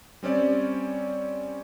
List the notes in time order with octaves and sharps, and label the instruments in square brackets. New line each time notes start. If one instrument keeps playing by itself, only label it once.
[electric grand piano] G3 C4 C#4 D5